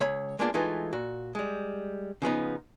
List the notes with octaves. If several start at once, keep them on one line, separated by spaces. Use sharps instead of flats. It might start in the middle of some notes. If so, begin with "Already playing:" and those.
C#2 C#5 B5
G#3 A#3 B3 D4 F4 G#4
E3 G#3 A3 D#4 F4 B4
A#2 F#4
G3 G#3
C#3 F3 B3 D#4